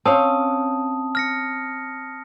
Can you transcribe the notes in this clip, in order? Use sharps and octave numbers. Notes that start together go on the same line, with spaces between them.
C4 C#4 F5 A5 D#6
F6 A#6 C#7